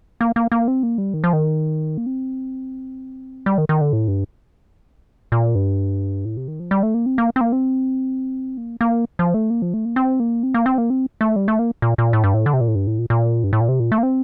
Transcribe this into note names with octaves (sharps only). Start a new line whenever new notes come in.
A#3
A#3
A#3
C4
A#3
G3
D#3
F3
D#3
A#3
C4
G3
D#3
D#3
D3
A2
G2
A#2
G2
A2
C3
D#3
F3
G3
A3
A#3
C4
A#3
C4
A#3
C4
A#3
A#3
F3
A3
A#3
F3
A3
A#3
C4
A#3
C4
A#3
C4
A#3
C4
A3
G3
A3
A#3
A#2
A#2
A2
G2
A2
D3
C3
A#2
A2
G2
A2
A#2
A#2
G2
A2
A#2
C3
A#2
A3
A#3
C4